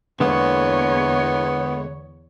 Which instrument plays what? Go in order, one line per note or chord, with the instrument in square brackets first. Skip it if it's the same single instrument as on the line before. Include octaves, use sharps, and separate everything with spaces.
[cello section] E2 C#5 [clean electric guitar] D3 G#3 A#3 [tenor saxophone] B3